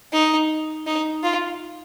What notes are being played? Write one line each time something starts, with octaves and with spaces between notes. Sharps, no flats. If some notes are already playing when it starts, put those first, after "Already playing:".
D#4
D#4
F4